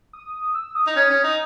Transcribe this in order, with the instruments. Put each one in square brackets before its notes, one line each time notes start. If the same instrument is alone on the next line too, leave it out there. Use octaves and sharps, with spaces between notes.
[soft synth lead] D#6
E6
D#6
[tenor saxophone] D#4
C#4
C#4
D#4